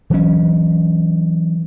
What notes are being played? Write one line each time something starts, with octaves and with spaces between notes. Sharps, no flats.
E3 F#3 C#4